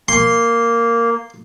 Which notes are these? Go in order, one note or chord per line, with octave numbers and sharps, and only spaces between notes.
A#3 C6